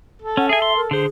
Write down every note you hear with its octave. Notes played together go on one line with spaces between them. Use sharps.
A4
C#4 F#5
G#4 E5 G#5
C6
A#4
D3 G#4 C5